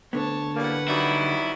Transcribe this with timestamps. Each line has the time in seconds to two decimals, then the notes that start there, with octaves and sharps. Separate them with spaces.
0.13 D2 D3 B3 C#5 A5
0.57 A2 G3 A#3 B4 F#5
0.89 F#3 G3 D#4 E4